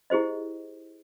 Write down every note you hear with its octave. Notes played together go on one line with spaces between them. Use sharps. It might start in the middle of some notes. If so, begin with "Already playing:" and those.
E4 G4 G#4 C5 D#5